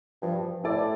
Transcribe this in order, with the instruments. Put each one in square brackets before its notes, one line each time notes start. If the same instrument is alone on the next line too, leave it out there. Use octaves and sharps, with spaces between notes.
[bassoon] G2 [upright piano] F3
[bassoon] A2 [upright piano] A3 E4 A4 D5